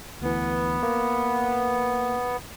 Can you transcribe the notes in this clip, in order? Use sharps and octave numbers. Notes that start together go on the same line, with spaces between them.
D2 E3 B3
A#3